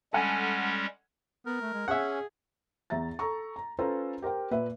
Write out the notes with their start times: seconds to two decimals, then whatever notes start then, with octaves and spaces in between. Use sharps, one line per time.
0.13 G3 G#3 C#4 A4 F#5 G#5
1.46 B3 A#4
1.62 A3
1.74 G#3
1.88 C#4 G#4 E5 F#5
2.90 E2 E5 A#5 A6
3.19 A4 A#5 C#6
3.56 A#5
3.79 C#4 F4 A4 B4 C5 A#5
4.22 G4 A#4 C5 G5
4.51 A#2 B4 E5